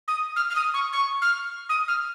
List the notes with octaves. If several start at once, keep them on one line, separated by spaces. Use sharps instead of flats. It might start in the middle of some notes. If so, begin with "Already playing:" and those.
D#6
F6
F6
D#6
C#6
C#6
F6
D#6
F6